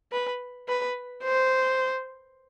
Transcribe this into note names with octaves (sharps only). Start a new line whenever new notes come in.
B4
B4
C5